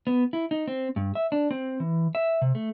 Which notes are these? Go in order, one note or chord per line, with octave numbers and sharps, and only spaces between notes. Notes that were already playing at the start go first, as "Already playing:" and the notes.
B3
E4
D#4
C4
G2
E5
D4
C4
E3
E5
C3
A3